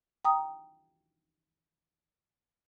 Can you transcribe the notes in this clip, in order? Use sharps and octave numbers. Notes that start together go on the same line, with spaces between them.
G5 A#5 D#6